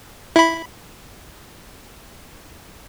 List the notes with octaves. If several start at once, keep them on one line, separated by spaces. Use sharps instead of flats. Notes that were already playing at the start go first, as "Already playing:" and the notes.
E4 B5